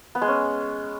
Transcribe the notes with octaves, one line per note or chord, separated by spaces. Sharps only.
B3
G#3
C#4